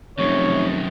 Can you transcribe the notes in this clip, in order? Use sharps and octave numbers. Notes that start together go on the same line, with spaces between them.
F1 F#2 D#3 C#5